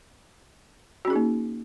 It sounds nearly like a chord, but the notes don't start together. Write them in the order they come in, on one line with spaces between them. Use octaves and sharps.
F#4 C#4 G#4 D#4 A#3